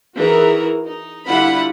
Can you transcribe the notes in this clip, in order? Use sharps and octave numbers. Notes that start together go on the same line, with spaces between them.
E3 D#4 F#4 G#4 A#4
D#4
D3 G3 E4 F4 F#5 B5